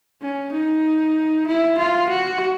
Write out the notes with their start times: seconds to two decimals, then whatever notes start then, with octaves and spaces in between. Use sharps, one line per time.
0.22 C#4
0.53 D#4
1.47 E4
1.79 F4
2.09 F#4